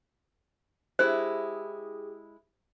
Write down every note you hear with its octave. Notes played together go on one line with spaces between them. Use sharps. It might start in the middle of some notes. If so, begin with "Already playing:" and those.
G#3 E4 G4 G#4 C5